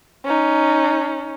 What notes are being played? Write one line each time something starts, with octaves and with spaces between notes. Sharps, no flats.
C#4 D#4